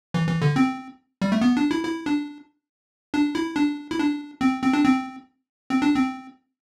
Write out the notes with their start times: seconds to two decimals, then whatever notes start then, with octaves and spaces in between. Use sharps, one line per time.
0.14 E3
0.28 E3
0.42 D3
0.56 C4
1.22 G3
1.32 A3
1.41 B3
1.57 D4
1.71 E4
1.84 E4
2.06 D4
3.14 D4
3.35 E4
3.56 D4
3.91 E4
3.99 D4
4.41 C4
4.63 C4
4.73 D4
4.85 C4
5.70 C4
5.82 D4
5.95 C4